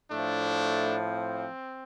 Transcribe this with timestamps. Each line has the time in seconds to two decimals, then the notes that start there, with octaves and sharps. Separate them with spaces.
0.11 A2 F3 A3 D4
1.06 C4